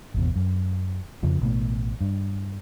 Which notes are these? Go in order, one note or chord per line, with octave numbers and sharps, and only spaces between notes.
G#1 E2 B2
F#2
F2 C#3 F3
A1 B2 A3
G2